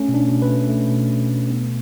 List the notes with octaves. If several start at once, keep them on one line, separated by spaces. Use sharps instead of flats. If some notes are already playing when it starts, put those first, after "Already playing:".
Already playing: A3 C#4
B2
D4
B2
B4
A3
A3
B2
B2
A3
B3